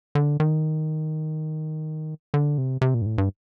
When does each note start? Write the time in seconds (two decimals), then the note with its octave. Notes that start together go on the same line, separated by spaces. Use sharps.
0.15 D3
0.40 D#3
2.34 D3
2.58 C3
2.81 C3
2.94 A#2
3.02 G2
3.06 A2
3.18 G2